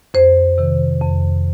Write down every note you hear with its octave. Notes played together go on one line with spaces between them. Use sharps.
F2 C5
C3 D#3
F2